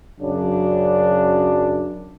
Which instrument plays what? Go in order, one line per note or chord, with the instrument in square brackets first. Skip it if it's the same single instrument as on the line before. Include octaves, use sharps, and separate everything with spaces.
[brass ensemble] F#2 C#3 F#3 D4